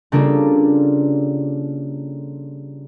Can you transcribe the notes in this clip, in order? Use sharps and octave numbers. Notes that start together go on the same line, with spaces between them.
C#3 G3 A#3 D4 F4 A4